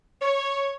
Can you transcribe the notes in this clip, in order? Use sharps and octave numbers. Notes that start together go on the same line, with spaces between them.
C#5